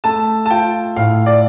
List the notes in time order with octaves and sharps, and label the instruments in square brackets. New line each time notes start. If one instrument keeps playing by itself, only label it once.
[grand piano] A3 [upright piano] A5
[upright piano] A5
[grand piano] F4 [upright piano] G5
[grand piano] A2 [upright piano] F5
[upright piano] D5